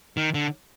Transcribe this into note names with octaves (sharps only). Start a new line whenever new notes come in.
D#3
D3